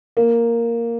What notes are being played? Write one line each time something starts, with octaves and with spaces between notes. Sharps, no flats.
A#3